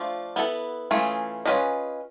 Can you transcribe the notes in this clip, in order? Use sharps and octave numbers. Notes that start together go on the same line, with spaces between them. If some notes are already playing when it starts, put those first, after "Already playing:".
Already playing: F3 A3 D4 F4
B3 E4 A4
E3 A3 C#4 F4 G#4
C#4 F4 G#4 B4 D#5